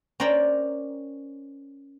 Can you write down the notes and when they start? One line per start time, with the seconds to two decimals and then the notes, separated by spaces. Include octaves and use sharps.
0.20 C#4 A#4 C5 D5 G5 A#5